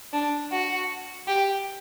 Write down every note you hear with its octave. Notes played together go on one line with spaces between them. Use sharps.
D4
F#4
G4